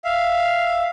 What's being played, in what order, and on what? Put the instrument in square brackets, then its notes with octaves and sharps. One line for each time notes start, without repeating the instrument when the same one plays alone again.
[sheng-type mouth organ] E5 F5